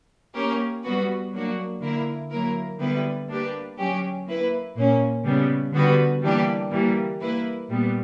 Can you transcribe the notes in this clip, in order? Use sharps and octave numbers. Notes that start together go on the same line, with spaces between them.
A#3 C#4 G4 A#4
G3 B3 F#4 B4
F#3 A#3 D4 F#4
D3 A#3 E4 A#4
F#3 A#3 E4 A#4
D3 G3 B3 E4 B4
A#3 D4 G4 B4
F#3 C#4 G4
A#3 E4 B4
A#2 A#3 C#4
C#3 G3 B3
D3 G3 B3 F#4 B4
E3 G3 A#3 D4 G4
E3 G3 A#3
A#3 E4 B4
A#2 G3 B3